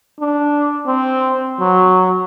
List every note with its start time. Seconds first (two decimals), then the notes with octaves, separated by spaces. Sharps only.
0.20 D4
0.87 C4
1.60 F#3